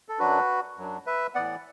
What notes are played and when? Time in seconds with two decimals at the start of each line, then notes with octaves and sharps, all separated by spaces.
0.09 A4
0.19 F#2 F#3 D4 F#4 B4
0.78 F#2 F#3 D4
1.07 B4 E5
1.35 A2 E3 B3 D5 F#5